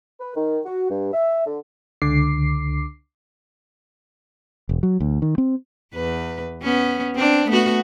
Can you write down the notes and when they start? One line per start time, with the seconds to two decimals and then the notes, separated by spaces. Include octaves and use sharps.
0.20 B4
0.36 D#3
0.65 F#4
0.90 G2
1.13 E5
1.46 D3
2.02 C#2 D3 D6 C7
4.69 E1
4.83 F#3
5.00 D2
5.22 D#3
5.38 C4
5.94 E2 B4
6.62 B3 C#4
7.16 C4 D4
7.48 A3 B3 F#4